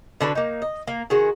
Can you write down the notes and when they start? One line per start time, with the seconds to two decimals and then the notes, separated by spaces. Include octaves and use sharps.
0.21 D3 D4 F#4 B4
0.35 A#3 D#4
0.62 D#5
0.87 A#3
1.10 D#3 G#3 F#4